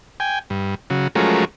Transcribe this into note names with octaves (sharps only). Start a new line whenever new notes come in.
G5 G#5
G2
C#3 F#3
F3 F#3 G#3 A3 C#4 A#4